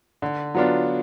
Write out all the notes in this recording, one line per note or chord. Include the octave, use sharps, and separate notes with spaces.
D3
F#3 B3 D4 F4